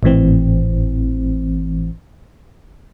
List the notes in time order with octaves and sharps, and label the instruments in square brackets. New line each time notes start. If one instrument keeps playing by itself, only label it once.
[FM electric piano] G#1 A2 E3 C4